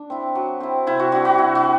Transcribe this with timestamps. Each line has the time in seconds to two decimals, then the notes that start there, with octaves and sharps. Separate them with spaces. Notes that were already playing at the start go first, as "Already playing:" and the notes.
Already playing: D4
0.10 C4 E4
0.35 F#3
0.60 C4 E4
0.87 C3 E4
0.99 F#4
1.12 G3 D4 F#4
1.25 F#4
1.38 C3 E4
1.55 F#4
1.63 G3